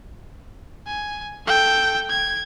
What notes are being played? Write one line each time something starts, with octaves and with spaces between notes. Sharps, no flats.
G#5
A4 G5
G#6